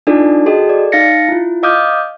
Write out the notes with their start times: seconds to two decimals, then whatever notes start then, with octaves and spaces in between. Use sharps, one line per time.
0.07 D4 D#4 F4 A4 D5
0.46 F#4 G#4 A4 D#5 G5
0.69 D5
0.92 D#4 F5 A6 A#6 C#7
1.29 E4 F4
1.63 D#5 F5 D6 D#6 F6 G6